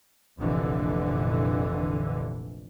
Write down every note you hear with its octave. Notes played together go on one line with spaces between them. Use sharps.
F1 A#1 F2 D3 E3